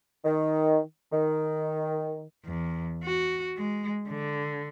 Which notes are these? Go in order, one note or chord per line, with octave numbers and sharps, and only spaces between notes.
D#3
D#3
E2
F#4
G#3
D3